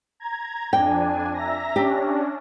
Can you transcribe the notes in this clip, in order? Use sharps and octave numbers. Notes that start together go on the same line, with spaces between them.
A#5 G#6
F2 D4 G5 G#5
E5 A#5 A#6
C#4 D4 G4